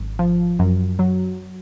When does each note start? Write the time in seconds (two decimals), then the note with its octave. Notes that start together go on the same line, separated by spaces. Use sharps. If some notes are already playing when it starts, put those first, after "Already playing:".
Already playing: G#1 F#2
0.19 F3
0.59 F#2
0.99 F#3